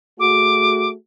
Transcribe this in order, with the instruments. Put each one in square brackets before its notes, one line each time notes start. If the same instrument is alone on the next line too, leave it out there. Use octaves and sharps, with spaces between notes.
[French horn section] A3 F#4 G#4 [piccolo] D6